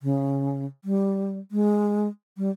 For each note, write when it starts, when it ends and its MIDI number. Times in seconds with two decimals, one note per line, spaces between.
0.03 0.66 49
0.85 1.39 55
1.51 2.08 56
2.38 2.50 55